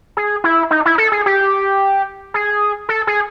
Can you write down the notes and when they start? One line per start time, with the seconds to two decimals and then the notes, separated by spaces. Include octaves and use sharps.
0.17 G#4
0.44 E4
0.71 D#4
0.85 E4
0.98 A4
1.12 G#4
1.26 G4
2.34 G#4
2.89 A4
3.07 G#4